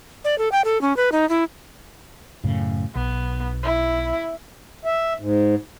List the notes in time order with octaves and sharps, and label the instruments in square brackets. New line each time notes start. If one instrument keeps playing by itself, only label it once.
[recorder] D5
A4
G5
A4
C#4
B4
D#4
E4
[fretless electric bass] F#2 A2 C#3
[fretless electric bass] B1 [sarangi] B3
[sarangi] E4
[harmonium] E5
G#2